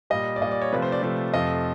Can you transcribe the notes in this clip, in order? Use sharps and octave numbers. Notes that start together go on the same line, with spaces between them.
A#2 G3 D#5
D5
A#2 G3 D#5
D5
C#5
C3 F3 A3 B4
C5
D5
C3 F3 A3 D5
F2 C3 F3 A3 D#5